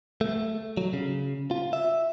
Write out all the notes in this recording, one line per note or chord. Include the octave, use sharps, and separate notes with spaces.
A3
F#3
C#3
F4
E5